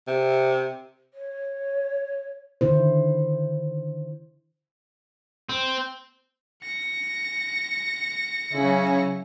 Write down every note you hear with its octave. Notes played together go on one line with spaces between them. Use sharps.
C3
C#5
D3 D#3 E4 C5
C4
A#6 C#7
C#3 F#3 C#4 E4